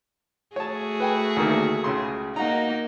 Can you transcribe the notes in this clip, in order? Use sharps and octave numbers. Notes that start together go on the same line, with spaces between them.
A3 F#4 G#4 C#5 A5
B4 G5 G#5
D2 D#3 A#3
C#2 C#3 C6
A#3 D#4 F#4 A#5